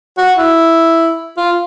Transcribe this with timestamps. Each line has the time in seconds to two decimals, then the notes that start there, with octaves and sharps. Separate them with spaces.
0.18 F#4
0.37 E4
1.37 F4